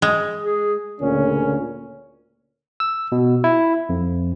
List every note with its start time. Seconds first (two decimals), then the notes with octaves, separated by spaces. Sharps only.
0.02 G#3
0.43 G#4
1.01 D2 A#2 C#3 C#4
2.80 E6
3.12 B2
3.44 E4
3.89 F2